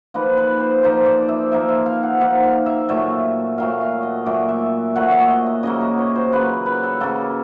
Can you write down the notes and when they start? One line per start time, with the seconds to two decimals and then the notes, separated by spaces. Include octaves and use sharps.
0.14 F3 A#3 D#4 B4
0.37 B4
0.60 C5
0.83 F3 A#3 D#4 C5
1.06 D5
1.29 E5
1.52 F3 A#3 D#4 E5
1.69 E5
1.86 F5
2.03 F#5
2.20 F3 A#3 D#4 F#5
2.44 F5
2.66 E5
2.89 A#2 F#3 A3 E5
3.58 A#2 F#3 A3 F5
3.81 F5
4.03 D#5
4.26 A#2 F#3 A3 D5
4.49 E5
4.95 A#2 F#3 A3 F#5
5.11 E5
5.30 D#5
5.47 D#5
5.63 C#3 F#3 A#3 D#5
5.81 D#5
5.98 C#5
6.16 C5
6.32 C#3 F#3 A#3 B4
6.66 B4
6.83 A4
7.01 C#3 F#3 A#3 A4